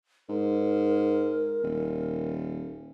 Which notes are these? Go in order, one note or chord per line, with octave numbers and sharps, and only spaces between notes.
G#2 A#4
D#1